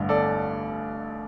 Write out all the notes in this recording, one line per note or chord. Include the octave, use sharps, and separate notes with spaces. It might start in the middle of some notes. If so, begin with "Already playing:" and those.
Already playing: A1 G2 D3
A4 D5